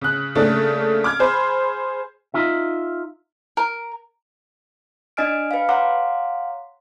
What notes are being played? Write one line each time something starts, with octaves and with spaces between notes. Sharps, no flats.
C#3 F#6
C#3 A3 A#3 D4
D6 F6 G#6
G#4 C5 B5
D#4 F4 E5
A#4
D4 D#5 G#5 F6 D7
B4 F5
C#5 F5 F#5 A#5 C6 D6